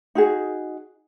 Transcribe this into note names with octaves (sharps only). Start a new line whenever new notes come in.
D#4 F#4 G#4